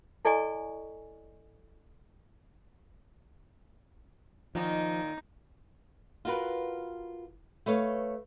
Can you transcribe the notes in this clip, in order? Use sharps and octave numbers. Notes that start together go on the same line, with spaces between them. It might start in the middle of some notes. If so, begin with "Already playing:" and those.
E4 A4 D5 D#5 G#5 C#6
A#2 D#3 F3 D#4
F4 F#4 A#4 B4
A3 B4 C#5 F5